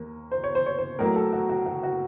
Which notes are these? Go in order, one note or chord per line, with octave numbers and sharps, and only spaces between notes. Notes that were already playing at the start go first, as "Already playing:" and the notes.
Already playing: D#2 A#3
C5
C#5
C5
C#5
C5
A2 F#3 A#3 A#4
A4
F#4
F#4
F#4
F#4